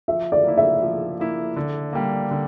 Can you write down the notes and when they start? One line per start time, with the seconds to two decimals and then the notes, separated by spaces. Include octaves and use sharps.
0.08 F3 E5
0.32 D5
0.44 A#3 E4
0.58 E5
0.82 F3
1.20 A#3 E4
1.56 D3
1.93 G3 A#3
2.31 D3